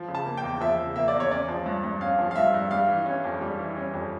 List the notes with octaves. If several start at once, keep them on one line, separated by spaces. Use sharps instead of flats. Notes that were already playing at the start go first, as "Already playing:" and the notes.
Already playing: F3
C#3
A5
A#3
G5
E2
F3 E5
C#3
A#3 E5
D5
E2
C#5
C#4 D5
F3
G2
G2
C#4 F5
F3
F5
G2 E5
G2
G3 F5
E3
C#4
F2
G3
E3
C#4
F2